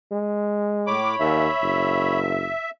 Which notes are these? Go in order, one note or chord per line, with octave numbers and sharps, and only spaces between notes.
G#3
A2 C#5 B5 D6
D#2 E5
F#1